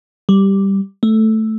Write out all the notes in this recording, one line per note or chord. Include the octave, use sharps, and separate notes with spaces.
G3
A3